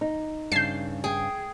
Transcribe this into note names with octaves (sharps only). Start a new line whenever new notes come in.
D#4
G2 C#3 A5 G6 C7
G#4 G5